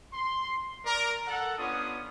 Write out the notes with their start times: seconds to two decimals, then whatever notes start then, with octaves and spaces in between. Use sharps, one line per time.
0.13 C6
0.85 A#4 D5
1.28 A4 F#5
1.58 B3 C#4 D4 F4 C#5 D#6